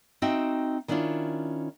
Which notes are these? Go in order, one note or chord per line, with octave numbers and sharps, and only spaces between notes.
C4 D#4 F#4 D#5 E5 G5
D#3 C#4 D4 E4 F4